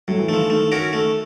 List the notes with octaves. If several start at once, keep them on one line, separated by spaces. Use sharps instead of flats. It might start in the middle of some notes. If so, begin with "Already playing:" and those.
A2 F#3
E3
D#3 F3 A3
D#3 A3
C#4 F#4 A#4
A3